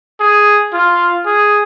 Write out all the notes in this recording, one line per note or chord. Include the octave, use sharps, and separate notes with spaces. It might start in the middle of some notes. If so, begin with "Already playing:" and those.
G#4
F4
G#4